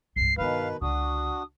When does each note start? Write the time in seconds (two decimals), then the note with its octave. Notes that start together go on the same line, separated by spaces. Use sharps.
0.16 C2 G2 C7
0.38 G2 B2 D#3 B3 B4 F5
0.82 C#2 D3 D4 F#4 D#6